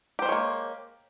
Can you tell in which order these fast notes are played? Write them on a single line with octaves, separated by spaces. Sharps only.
G4 C5 G#3 C#5 A#3